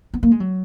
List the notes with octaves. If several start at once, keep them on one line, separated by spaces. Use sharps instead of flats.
B3
A#3
G#3
F#3